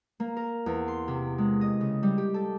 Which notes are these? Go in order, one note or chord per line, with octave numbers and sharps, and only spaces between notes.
A#3
A#4
E2
C6
C3
G#3
D#5
C#3
G3
G4
A4